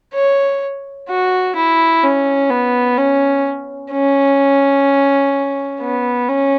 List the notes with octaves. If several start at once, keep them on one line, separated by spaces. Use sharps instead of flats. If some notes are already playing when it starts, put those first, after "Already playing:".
C#5
F#4
E4
C#4
B3
C#4
C#4
B3
C#4